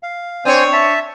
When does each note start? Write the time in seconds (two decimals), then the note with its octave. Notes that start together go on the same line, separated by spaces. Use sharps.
0.03 F5
0.45 C4 D4 C5 C#5 G#5
0.73 E5 A5